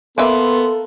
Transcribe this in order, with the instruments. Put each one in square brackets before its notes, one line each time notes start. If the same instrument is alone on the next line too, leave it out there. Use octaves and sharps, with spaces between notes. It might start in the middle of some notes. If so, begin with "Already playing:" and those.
[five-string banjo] A#3 B4 E5 [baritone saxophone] B3 [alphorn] A4 [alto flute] C6